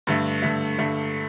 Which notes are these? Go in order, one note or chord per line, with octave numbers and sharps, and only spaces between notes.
G2 D3 A3
G2 D3 A3
G2 D3 A3